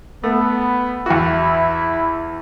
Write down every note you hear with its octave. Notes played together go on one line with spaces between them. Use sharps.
A3 B3
E2 E4 F#4